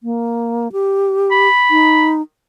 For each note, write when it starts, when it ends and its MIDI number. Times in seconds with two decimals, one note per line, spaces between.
0.03 0.71 58
0.72 1.48 67
1.31 2.11 83
1.71 2.21 63